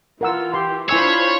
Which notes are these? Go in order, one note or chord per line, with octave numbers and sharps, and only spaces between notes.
E3 F4 A#4 F#5 E6
G4 C6
D4 E4 F4 C5 C#5 G#5 B5 E6